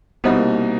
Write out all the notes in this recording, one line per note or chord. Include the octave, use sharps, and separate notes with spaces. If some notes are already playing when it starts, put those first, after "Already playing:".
C2 B2 G3 B3 C4 D#4
A#3